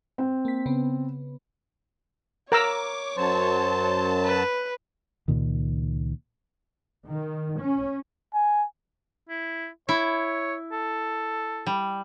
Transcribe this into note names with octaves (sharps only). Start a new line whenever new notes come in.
C4
A#3 B6
C#3 B3
A#4 C#5 A#5 D6 E6
F#2 F#3 C5 A5
B4
C#2 A#2 D#3
D#3
C#4
G#5
E4
E4 C#5
A4
G3